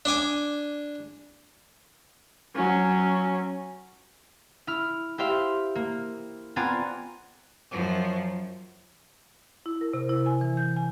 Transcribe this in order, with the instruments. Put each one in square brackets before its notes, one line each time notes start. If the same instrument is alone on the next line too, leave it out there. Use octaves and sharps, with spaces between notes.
[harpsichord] D4 D5 G#5 D6
[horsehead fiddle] F#3 C#4
[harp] E4 F6
E4 G4 C5 E5 F5
A#3
B3 C4 F4 D5 G#5 A#5
[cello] F#2 F3
[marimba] E4
A#4
C3
E4
G#5
E3
G6
G#5